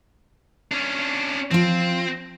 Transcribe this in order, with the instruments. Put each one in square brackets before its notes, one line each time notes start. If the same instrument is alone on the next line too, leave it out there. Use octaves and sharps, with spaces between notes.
[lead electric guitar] C#4 D4
[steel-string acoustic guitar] F3 F4 [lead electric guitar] C4